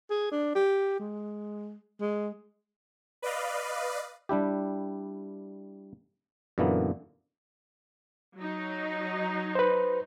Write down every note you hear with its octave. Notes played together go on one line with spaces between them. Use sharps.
G#4
D4
G4
G#3
G#3
B4 D5 D#5 F5
G3 D4 E4 G4
F#2 A#2 D3 E3 A#3 B3
F#3 D#4
B4 C5